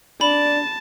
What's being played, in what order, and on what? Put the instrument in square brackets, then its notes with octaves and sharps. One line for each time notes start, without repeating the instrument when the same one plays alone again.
[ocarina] D4 [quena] D5 [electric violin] A5 [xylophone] B5